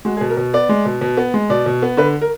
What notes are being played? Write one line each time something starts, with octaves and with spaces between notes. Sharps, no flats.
G#3 F#4
G#4
B2
A#4
B2
B3 D5
G#3
B2
B2
B3
G#3
B2 D5
B2
B3
D3 B4
A#4